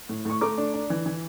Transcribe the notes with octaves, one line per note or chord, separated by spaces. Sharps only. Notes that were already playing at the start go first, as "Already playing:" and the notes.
A2
A2 C#6
A3 A#5 D6
D4
D4
E3
E3